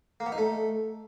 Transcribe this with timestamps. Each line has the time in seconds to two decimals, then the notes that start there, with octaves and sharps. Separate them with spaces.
0.20 A#3
0.26 B3
0.32 D#4
0.38 A3